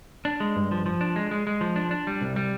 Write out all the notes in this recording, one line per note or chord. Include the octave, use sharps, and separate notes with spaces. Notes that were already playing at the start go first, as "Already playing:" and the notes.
D4
G#3
G2
F3
F3
D4
G#3
G#3
G#3
F3
D4
D4
G3
C2
G3